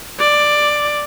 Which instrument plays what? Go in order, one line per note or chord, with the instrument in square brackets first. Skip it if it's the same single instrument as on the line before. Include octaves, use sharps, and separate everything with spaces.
[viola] D5